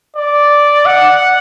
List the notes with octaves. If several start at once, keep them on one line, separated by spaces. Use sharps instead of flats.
D5
F#5